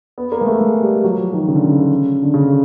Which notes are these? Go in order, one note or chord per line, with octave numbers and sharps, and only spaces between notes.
B3
A#3
G#3
A3
G#3
G3
F#3
F3
D#3
C#3
D3
C#3
D3
C#3